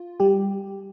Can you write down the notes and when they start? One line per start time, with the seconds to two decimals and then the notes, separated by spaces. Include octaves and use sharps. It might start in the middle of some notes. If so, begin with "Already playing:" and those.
Already playing: F4
0.20 G3 G4